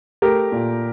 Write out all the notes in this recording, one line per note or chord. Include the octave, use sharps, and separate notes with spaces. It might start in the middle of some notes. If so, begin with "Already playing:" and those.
A3 G4 A#4
A#2